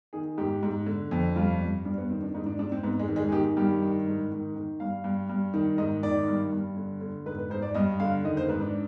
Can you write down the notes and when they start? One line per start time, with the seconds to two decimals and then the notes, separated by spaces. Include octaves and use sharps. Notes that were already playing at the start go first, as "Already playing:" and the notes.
0.13 D#3 G#4
0.38 G#2 G4
0.63 G#2
0.86 D3
1.11 F2
1.36 G2 F4
1.61 G2
1.85 G2 D4
1.98 B3
2.09 D#3 C4
2.22 D4
2.34 G#2 D#4
2.46 D4
2.59 G#2 D4
2.72 C4
2.83 G#2 B3
2.99 G#3
3.08 D#3
3.16 G#3
3.28 G#4
3.32 D#3 G4
3.57 G2 G4
3.82 D#3
4.06 G#2
4.31 D#3
4.56 D#3
4.80 G2 F5
5.04 G2
5.29 G2
5.54 D#3
5.78 G#2 D#5
6.03 D#3 D5
6.28 G2
6.52 G2
6.76 D3
7.01 D3
7.26 G#2 B4
7.39 B4
7.50 G#2 C5
7.62 D5
7.74 G2 D#5
8.00 D3 F5
8.24 D#3 D#5
8.37 C5
8.48 G#2 B4
8.61 D4